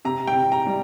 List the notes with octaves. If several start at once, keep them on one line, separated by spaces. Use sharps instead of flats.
C3 A#5
G5
C3
A#5
G3